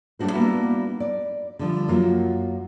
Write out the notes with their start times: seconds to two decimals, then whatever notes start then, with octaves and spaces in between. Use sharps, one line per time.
0.19 G3 A3 C#4 D4 F#4 C5
0.32 G3 A#3 B3 D4 E4 F#4
1.00 D5
1.59 D3 F3 G3
1.88 F#2 A#3 F4 F#4